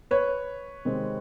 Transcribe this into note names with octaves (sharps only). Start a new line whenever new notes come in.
B4 C#5
C3 D#3 G#3 C4